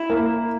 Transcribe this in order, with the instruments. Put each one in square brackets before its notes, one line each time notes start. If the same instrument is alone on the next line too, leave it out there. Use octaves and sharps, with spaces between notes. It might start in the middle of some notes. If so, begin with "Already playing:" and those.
Already playing: [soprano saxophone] E4
[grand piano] A#3